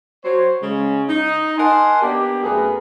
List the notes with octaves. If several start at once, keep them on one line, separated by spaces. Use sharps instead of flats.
F#3 C5 C#5
C#3 G#3 C#4
D#4
A#4 D#5 F#5 G#5 A5 C6
A#3 B3 D4 G4
F#2 A3 B3 G#4 A#4 B4